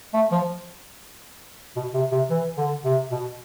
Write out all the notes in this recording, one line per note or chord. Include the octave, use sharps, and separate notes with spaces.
A3
F3
B2
C3
C3
E3
D3
C3
B2